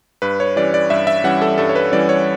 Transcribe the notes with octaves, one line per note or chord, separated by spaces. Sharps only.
G2 B4
C#5
E3 G3 C#4 D5
D5
G2 E5
E5
E3 G3 C#4 F#5
A4
G2 A4
C#5
B4
E3 G3 C#4 D5
C#5